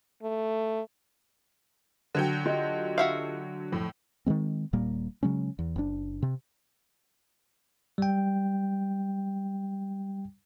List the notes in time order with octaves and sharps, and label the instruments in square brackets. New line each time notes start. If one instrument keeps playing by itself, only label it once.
[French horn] A3
[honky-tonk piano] D3 F#3 G5
[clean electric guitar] F4 G4 D#5
[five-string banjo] F#4 E5 F5
[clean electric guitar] F2 [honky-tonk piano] A2
[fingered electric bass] D#3 F3 G#3 C4
D#1 A#2 G3 A#3
C#3 F#3 G#3 C#4
E2
F#1 D4
C3
[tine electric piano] G3 G5